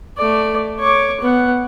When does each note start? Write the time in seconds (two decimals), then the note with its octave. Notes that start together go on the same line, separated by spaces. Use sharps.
0.18 A3 D5
0.80 C#5 D6
1.21 B3 F#5